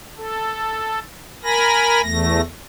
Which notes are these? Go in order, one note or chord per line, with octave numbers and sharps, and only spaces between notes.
A4
A#4 G#5 B5 A#6
E2 A3 A#6